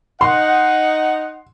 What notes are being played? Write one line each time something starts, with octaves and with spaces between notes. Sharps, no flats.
D#4 F#5 C6